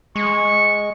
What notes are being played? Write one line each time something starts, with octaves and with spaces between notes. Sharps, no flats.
G#3 C#6